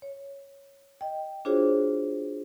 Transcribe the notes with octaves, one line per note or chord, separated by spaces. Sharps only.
C#5
D#5 G5
D4 F4 F#4 G#4 C5 C#5